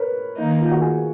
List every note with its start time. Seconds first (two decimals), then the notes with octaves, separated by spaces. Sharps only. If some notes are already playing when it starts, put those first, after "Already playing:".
Already playing: A#4 B4 C#5
0.37 D#3 A#3 D#4
0.61 F4
0.71 F#4
0.81 G#4